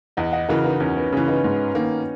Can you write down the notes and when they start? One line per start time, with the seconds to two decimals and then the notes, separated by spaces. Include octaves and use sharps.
0.17 E2 D#5 F#5
0.33 D#5 F#5
0.49 C#3 E3 F#4 A#4
0.64 B3 D#4
0.80 E2 C#4
0.96 B3
1.12 C#3 E3 C#4
1.28 B3 D#4
1.44 G#2
1.75 D#3 A#3